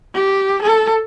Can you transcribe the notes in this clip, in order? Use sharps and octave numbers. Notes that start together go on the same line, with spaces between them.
G4
A4